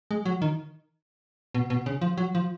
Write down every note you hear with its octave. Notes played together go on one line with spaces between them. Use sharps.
G#3
F#3
D#3
B2
B2
C#3
F3
F#3
F3